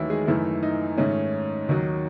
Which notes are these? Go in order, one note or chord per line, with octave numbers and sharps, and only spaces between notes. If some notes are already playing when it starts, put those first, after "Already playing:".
Already playing: D#2 D#3 E3 F#3 A3 E4
G#3 G#4
F#2 D#3 E3 A3 E4
D#4
G#2 D#3 A3 C#4
D#2 D#3 F#3